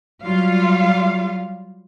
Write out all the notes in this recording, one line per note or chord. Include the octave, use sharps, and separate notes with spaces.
F#3 G3 F4 F5